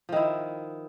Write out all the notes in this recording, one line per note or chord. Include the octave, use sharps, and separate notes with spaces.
D#3 F3 E4